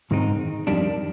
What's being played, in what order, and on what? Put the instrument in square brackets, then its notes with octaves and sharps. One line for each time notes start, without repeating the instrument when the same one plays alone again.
[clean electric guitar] G#2 D#3 G#3 C4 D#4
F2 D#3 G3 D4